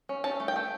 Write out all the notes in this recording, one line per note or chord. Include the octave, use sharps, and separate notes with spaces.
C#4
C#4 A5
A3
G5
A3